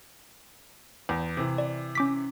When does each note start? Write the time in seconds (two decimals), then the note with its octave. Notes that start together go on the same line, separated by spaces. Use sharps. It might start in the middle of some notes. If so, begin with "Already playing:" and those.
1.09 E2
1.37 C3 E3
1.58 D5
1.95 C#4 D6 B6